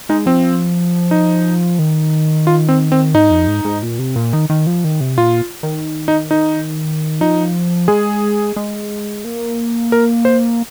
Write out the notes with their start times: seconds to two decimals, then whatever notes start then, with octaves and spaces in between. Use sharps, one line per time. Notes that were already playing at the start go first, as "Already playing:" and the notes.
0.09 G#3 D#4
0.26 F3 C4
1.11 D#4
1.79 D#3
2.47 F4
2.69 C4
2.92 C4
3.15 G#2 D#4
3.31 F2
3.48 G#2
3.65 G#2
3.83 A#2
3.99 C3
4.16 A#2
4.33 D#3
4.50 D#3
4.67 F3
4.84 D#3
5.01 C3
5.18 A#2 F4
5.63 D#3
6.08 D#4
6.31 D#4
7.21 F3 D#4
7.88 G#3 G#4
8.56 G#3
9.25 A#3
9.92 A#4
10.25 C5